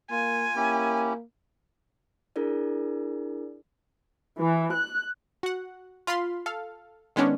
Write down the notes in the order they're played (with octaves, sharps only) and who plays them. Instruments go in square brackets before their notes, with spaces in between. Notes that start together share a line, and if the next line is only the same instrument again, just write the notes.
[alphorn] A#3 [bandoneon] F4 [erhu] G#5
[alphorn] A#3 [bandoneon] C#4 E4 G4
[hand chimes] D4 E4 G#4 A#4 D5
[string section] E3
F#6
[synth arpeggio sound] F#4 F#5
F4 F5 B5 C6
A4 F5
D#3 G#3 B3 C#4 D4